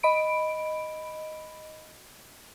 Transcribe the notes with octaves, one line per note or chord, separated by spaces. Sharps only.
D#5 B5 D7